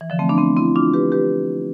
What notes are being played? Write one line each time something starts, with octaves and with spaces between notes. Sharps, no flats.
E3
D3 F3
A3 C4
B3 D4
A3 C4
C4 E4
D4 F4
G4 B4
G4 B4